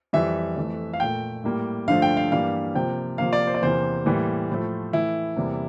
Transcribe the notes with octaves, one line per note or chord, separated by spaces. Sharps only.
F2 E3 G3 E5
F2 E3 A3
F5
A#2 A3 G5
A2 G3 A#3
G2 D3 F3 A3 F5
G5
F5
G2 E3 G3 A#3 F5
C3 F3 A#3 G5
C3 F3 A#3 F5
D5
C5
D5
E2 C3 E3 A#3 C5
A2 E3 G3 A#3
A2 F3 A3
A2 E3 A3 E4
E2 C3 G3 A#3